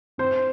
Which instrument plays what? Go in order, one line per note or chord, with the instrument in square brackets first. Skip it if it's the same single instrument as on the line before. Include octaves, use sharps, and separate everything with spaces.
[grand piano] C4 C5